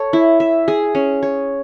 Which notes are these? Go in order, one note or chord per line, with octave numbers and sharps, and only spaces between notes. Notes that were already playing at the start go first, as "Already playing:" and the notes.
Already playing: A4 C#5
E4
E5
G#4
C#4
C#5